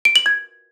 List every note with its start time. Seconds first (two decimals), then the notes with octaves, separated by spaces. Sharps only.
0.05 D7
0.16 F#7
0.26 G#6